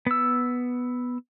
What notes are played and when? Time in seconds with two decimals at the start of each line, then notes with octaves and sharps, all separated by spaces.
0.07 B3 E6